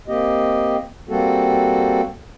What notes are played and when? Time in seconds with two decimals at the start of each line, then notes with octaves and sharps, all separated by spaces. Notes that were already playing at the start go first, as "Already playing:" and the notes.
0.08 A#3 C4 G4 D#5
1.09 G3 A#3 C4 F#4 A4